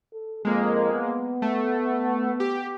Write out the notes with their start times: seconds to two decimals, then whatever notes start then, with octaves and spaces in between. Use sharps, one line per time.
0.13 A4
0.45 F2 G#3 A#3
0.93 B3
1.42 A3
2.40 G4